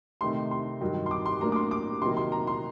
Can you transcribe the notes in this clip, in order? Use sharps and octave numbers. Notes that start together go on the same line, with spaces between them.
C3 D#3 A3 C6
C6
G2 D#3 F#3
C6
D6
C6
A2 F#3 A#3 D4 A#5
D6
C6
D6
C3 D#3 F#3 A#3 C6
C6
A#5
C6